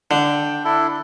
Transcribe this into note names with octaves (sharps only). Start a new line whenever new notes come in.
D3 G5
D4 E4 A4